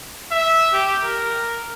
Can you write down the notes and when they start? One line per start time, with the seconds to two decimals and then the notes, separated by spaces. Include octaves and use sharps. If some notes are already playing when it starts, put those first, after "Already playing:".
0.31 E5
0.73 G4
1.04 A#4